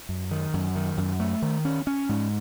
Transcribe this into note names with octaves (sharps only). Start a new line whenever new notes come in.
F#2
D#3
F#2
D#3
F#2
A3
D#3
C#4
C#4
G#2